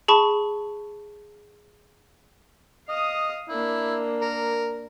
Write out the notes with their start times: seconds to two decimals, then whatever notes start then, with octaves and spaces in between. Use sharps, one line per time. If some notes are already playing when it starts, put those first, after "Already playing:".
0.08 G#4 A5 B5 C#6
2.89 D#5 F5 D#6
3.49 A#3 D4 E4
4.21 A#4